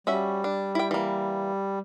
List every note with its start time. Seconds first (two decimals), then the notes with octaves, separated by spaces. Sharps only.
0.07 G3 C#4 F#4 E5
0.44 D4
0.75 E4 G5
0.91 E3 A#3